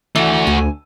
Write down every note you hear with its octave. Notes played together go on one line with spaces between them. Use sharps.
E3 A3 F#4
D2 G#5